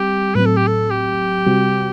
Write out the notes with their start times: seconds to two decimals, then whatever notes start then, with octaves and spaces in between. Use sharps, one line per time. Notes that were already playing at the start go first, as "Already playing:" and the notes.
Already playing: G3 C4 G4
0.35 A2 F#3 C4 B4
0.46 A4
0.57 G4
0.67 A4
0.91 G4
1.46 C3 G3 C4 F#4